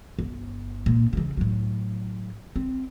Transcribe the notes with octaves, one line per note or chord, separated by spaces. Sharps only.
G1
A#2
C#3 E3
A2 F#3
C4